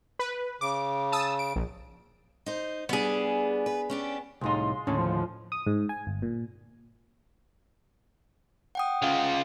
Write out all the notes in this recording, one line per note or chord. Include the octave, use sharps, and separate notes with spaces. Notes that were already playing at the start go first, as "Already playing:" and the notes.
B4
C#3 D6
A5 D#6 E6
D7
A#1
D#4 C5
G3 B3 D4 G#4
B4
C#4 D4 G4
C2 A2 G#3 D#4 F4 C6
D#2 A2 D3 C#4 D#5
F3
D#6
G#2
G#5
G1
A#2
F#5 G5 D#6
C#3 F4